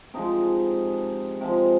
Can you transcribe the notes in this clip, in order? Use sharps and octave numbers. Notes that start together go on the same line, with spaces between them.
C3 F3 G#3 D#4
C3 F3 G#3